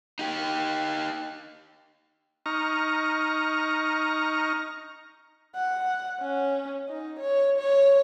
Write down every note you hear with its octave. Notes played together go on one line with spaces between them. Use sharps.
D#4 G4
D#4 A#5 C#6 F6
F#5
C#4
D#4
C#5
C#5